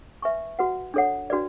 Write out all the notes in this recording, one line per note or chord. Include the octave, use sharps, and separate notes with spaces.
B4 E5 G#5 C#6
F#4 B4 F#5
D4 A4 C#5 F#5
D4 F#4 B4 D5